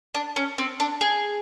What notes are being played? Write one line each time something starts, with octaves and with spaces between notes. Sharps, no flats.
D4
C#4
C4
D4
G#4